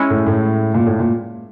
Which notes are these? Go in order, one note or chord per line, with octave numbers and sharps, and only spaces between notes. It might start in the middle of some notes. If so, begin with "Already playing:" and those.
Already playing: G#3 C#4 E4
A2
A2
A#2
A2
A#2